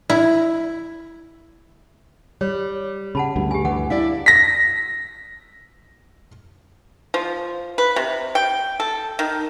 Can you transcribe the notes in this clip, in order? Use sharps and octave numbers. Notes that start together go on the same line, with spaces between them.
E4
G3 C#5
C#3 F#5 A5 B5
D2 G2
G4 G#5
E3 F#5
D4 E4 D5 F5
A#6 B6
F3
B4
C3
G5
A4
D#3